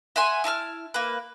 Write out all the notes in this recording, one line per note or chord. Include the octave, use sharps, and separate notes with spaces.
E5 F#5 G#5 C6
E4 A5 B5 F6
A#3 B4